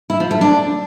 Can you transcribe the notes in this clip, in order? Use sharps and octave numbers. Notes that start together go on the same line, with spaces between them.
E4
F3
A3
D4